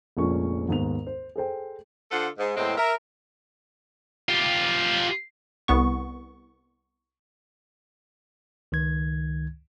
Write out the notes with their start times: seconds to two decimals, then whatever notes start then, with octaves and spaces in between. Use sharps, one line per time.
0.17 F1 A#1 A#2 G#3 C#4 C#6
0.69 D#2 G#2 B3 F7
1.07 C5
1.36 G#4 A4 C5 G5
2.11 D3 F4 A4 C5 F#5
2.38 G#2
2.56 E2 A2 G#3 C4
2.78 A#4 E5
4.29 F4 G4
5.68 C2 B3 C#6
8.72 C#2 D#3 G#6